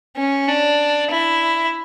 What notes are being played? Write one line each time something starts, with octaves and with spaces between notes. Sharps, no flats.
C#4
D4
E4